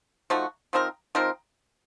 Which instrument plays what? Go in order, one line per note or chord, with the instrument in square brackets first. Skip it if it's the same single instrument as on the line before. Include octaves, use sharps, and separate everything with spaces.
[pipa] F3 A3 D#4 F#4
F3 C4 D#4 A#4
F3 C4 D#4 A#4